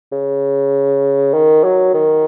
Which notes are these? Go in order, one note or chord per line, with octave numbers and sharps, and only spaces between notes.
C#3
D#3
F#3
D#3